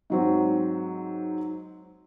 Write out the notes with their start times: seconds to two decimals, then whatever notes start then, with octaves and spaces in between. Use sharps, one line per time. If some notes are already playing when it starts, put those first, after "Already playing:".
0.10 G#2 F#3 C4